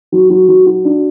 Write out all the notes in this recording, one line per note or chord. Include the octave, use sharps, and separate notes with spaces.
F#3
F#3
F#3
F#4
D4